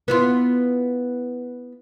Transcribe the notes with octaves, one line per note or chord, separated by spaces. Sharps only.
B3 E4 F4